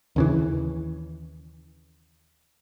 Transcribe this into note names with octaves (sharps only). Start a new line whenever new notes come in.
D#2 C#3 E3